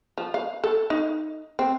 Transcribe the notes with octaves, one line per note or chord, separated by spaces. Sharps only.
F3
F5
A4
D#4
C4